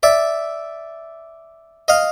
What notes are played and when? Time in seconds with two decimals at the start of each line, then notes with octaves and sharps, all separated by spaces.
0.03 D5 E5
1.88 D#5 F5